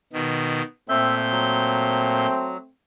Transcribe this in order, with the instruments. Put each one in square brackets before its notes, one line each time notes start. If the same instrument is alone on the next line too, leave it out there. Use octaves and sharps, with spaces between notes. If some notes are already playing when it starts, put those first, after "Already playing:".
[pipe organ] B2 D#3
[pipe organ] A#2 G6 [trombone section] A3 C4 [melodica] E5
[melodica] F#3